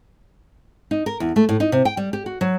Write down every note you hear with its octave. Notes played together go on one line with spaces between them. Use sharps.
D#4
A#4
E2
A3
A2
D#4
C3
G5
G3
G4
F#4
F#3